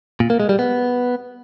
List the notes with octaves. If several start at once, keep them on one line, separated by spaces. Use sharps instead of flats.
A#2
A#3
G#3
G3
B3